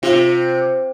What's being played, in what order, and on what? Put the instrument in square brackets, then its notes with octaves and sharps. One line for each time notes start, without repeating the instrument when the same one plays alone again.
[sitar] C3 [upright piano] F4